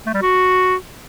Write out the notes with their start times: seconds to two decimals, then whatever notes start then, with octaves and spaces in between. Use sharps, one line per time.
0.06 A3
0.14 G3
0.22 F#4